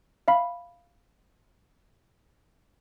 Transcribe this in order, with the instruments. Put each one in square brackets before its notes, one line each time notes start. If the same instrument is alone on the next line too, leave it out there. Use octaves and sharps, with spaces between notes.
[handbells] E5 F5 B5